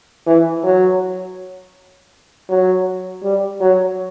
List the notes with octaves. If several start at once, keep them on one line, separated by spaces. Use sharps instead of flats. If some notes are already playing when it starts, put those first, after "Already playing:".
E3
F#3
F#3
G3
F#3